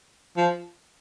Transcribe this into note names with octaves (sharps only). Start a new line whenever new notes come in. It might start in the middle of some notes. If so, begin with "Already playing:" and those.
F3